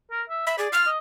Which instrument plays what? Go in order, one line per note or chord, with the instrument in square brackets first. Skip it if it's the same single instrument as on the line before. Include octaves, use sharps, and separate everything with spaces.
[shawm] A#4
E5
[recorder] E5 [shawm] B5
[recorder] G#4 [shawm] D5
[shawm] F4 [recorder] F6
[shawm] D#5